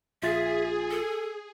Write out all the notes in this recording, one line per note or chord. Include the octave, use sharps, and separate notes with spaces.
A#1 F4 G#4 E5 A6
A4